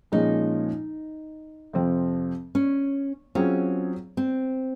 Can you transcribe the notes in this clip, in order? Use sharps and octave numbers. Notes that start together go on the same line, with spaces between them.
A#2 F3 G#3 C#4 D#4
F2 C3 F3 C4
C#4
F#3 C4 C#4 F4 G#4
C4